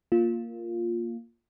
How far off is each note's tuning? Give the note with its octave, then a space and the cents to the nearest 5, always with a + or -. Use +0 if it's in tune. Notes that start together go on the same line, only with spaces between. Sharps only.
A#3 +0 F4 +0